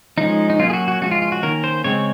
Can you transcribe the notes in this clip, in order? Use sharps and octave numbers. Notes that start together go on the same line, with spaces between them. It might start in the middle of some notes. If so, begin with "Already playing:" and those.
F3 G#3 C#4 D#4
D#4
F#3 A#3 C#4 F4
G#4
F#4
F#4
F3 G#3 C#4 F#4
F4
F4
F#4
D#3 A#3 C#4 A#4
C5
C#3 G#3 C4 C#5